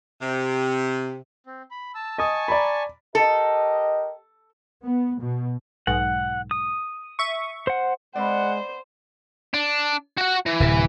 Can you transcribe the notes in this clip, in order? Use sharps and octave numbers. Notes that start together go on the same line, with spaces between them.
C3
C4
B5
A5 E6
D#5 G#5 A5 C#6 D#6
D5 A#5 B5
G4 A4 A#4 D#5
B3
B2
B1 G#2 F#5
D#6
E5 C#6
C5 F#5
G#3 B3 C4 C5 D5 F#5
D4
F#4 F#5
E3
D1 C3